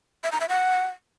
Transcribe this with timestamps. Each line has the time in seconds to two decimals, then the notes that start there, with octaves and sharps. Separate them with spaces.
0.24 E5
0.32 A#5
0.41 E5
0.49 F#5